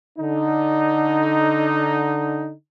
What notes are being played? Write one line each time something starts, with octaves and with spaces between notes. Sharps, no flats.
D3 D#4